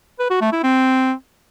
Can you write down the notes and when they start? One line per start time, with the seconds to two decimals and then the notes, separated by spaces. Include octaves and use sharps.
0.19 B4
0.30 F#4
0.41 A3
0.52 E4
0.63 C4